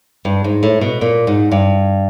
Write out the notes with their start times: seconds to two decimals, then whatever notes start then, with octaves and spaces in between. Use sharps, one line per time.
0.25 G2
0.44 G#2
0.63 A2
0.81 B2
1.01 A#2
1.27 G#2
1.51 G2